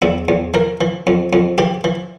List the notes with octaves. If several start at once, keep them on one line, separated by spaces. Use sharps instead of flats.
E2 E4
E2
E3 A#4
E3
F2
F2
E3 G4
E3